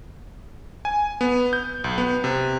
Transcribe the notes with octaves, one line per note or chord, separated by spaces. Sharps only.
G#5
B3
G6
B1
B3
C3